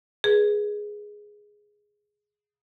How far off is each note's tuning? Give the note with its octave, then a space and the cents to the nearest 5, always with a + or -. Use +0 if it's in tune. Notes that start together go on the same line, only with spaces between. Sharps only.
G#4 +0 B4 -25